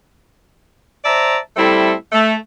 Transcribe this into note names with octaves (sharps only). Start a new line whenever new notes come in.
C5 D5 E5 A5 A#5
G3 A3 C4 E4 A4
A3